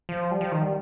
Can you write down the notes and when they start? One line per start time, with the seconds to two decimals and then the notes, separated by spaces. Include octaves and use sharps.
0.09 F3
0.31 G3
0.41 F3
0.52 D#3
0.62 G3